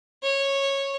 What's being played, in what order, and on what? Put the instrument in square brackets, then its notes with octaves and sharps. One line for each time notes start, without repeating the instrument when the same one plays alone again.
[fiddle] C#5